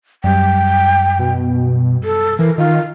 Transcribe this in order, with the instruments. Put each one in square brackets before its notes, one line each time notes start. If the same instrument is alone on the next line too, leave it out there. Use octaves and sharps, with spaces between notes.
[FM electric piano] F#2 G3 [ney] G5
[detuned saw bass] B2
[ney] A4
[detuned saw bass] E3 [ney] A#4
[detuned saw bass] D#3 [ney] F4